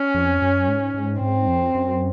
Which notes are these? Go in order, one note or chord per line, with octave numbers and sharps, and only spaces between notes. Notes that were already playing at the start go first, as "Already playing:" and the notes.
Already playing: C#4
F2
F#2
G#2
G#2
G#2 C4
F2
F#2